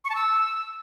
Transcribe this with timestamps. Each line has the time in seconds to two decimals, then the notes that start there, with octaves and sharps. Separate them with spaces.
0.04 C#6
0.10 A5
0.15 E6